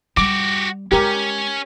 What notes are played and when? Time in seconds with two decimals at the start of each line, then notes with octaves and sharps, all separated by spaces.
0.17 G3 F#4 G4 D6
0.92 G#3 C#4 G4 A#4